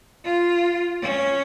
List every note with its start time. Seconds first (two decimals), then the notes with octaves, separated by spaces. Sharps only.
0.24 F4
1.01 C#4